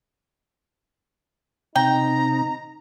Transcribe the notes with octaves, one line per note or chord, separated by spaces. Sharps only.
C3 D#4 G5 A#5